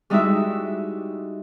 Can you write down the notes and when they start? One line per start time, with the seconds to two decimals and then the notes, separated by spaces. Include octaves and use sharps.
0.10 G3 G#3 D#4 E4 F#4 E5